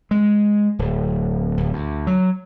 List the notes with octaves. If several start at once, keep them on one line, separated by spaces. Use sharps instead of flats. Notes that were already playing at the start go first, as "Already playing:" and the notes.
G#3
D1
D1
D2
F#3